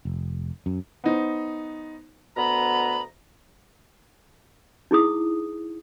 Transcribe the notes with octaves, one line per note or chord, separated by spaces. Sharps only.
F1
F#2
B3 D#4 C5
D2 B2 B3 A#5 B5
D#4 E4 G#4 D#6